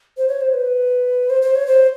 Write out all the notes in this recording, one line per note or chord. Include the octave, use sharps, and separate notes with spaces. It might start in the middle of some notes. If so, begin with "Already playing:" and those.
C5
C#5
C5
B4
C5
C5
C#5
C5